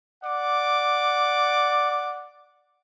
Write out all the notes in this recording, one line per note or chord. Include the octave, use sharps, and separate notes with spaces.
D5 F#5 D6